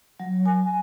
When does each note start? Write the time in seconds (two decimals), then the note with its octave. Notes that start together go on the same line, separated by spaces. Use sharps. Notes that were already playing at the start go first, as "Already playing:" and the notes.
0.20 F#3
0.46 G#5